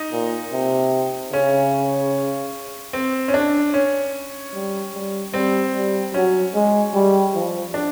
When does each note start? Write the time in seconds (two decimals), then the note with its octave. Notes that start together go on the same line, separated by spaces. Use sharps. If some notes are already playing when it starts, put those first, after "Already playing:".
Already playing: D#4
0.12 A#2
0.52 C3
1.32 C#3 C#4
2.93 C4
3.28 C#4
3.34 D4
3.74 C#4
4.54 G3
4.94 G3
5.34 G3 C4
5.74 G3
6.14 F#3 C#4
6.54 G#3
6.94 G3
7.35 F3
7.74 D4